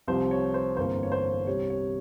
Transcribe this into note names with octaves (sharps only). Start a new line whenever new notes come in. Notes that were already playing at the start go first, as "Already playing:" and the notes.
C2 C3 F3 C5
C#5
C5
G1 F2 E3 A#3 C5
C#5
C5
C2 C3 G3 C#5
C#5